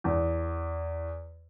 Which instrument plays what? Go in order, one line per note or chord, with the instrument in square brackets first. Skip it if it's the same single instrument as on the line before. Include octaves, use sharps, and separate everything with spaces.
[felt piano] E2